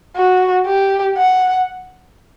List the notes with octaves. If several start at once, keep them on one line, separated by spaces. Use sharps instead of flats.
F#4
G4
F#5